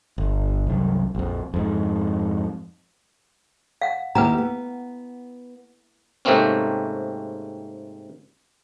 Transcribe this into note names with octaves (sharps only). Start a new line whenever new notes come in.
G1
C2 F#2
A#1 F2
F2 G#2
F5 F#5
D#2 E4 G4 B4 F#5 A#5
B3
G#2 C3 A3 A#3 C4 C#4